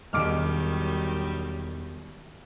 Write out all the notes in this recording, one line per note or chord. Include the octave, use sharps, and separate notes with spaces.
E1 D#2 D#3 F#3 G3 D6 F6 D7